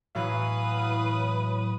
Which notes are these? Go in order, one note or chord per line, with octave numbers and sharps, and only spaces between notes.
A2 E3 F#3 B4 F5 D#6